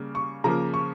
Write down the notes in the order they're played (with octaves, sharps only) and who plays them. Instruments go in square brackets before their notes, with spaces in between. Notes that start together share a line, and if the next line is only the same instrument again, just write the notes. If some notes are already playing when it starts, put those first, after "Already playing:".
Already playing: [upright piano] C#3 G3 A#3
C#6
C#3 F3 A#3 A#5
C#6